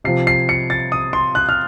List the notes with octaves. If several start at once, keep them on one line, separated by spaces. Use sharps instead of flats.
C3 F3 C4 C7
C7
C#7
A6
D#6
C6
F#6
F6